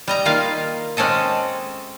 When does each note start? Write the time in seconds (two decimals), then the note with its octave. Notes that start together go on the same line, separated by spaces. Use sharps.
0.08 G3 D#5 A#5
0.25 D#3 A#3 F4 F5
0.97 G#3 C4 C#4 A4 D#5